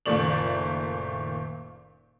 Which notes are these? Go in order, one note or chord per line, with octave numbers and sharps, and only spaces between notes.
F#1 A#2 D#3 A3 D5 F#7